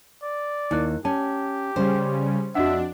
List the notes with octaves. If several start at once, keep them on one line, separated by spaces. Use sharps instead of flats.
D5
D#2 D#4 E4 F#6
C#4 G4 A5
C#3 G3 C#4 C5
F2 D4 F#4 D#5 E5 F#5